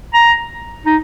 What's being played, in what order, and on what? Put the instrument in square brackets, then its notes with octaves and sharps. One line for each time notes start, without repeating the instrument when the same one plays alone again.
[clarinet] A#5
D#4